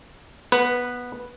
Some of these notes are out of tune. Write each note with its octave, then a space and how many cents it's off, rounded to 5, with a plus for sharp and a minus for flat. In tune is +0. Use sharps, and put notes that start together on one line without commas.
B3 -15 B4 +0